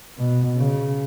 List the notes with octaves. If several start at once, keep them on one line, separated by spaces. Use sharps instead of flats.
B2
C#3